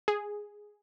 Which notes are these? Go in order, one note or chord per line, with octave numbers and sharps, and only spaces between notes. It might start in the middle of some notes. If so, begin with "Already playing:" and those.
G#4